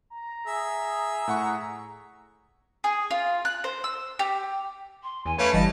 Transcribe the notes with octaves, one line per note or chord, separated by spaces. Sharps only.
A#5
G#4 E5
A2 F#5 C#6
G#4
F4
F#6
C5
E6
G4
C6
E2 G#5
A3 C#4 B4 C#5 F5 B5 D6
G1 E3 G3 D#5 A5